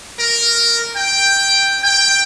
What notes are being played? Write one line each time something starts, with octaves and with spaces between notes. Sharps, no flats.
A#4
G5
G5